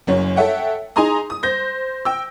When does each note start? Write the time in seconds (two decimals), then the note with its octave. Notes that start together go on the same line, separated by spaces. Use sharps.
0.07 F#1 F#2 C#5
0.36 A4 C#5 E5 F#5 G5
0.96 D#4 G#4 G#5 A#5 C6 D#6
1.30 D#6
1.43 C5 G6 A#6
2.05 G5 E6